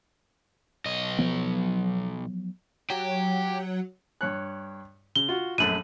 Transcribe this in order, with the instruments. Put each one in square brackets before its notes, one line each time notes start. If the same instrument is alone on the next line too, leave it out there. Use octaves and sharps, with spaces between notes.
[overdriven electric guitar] B1 D#5
[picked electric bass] F3 F#3 B3
[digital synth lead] F#3 [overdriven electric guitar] G4
[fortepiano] G2 C#5 F#6
[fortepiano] C#3 [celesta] G7
[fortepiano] F4 F#4
[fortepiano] A#1 F#2 A3 [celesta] D#7 F#7